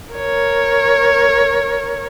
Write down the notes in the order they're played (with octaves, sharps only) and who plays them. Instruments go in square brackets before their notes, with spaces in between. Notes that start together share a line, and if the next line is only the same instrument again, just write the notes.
[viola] A#4 C#5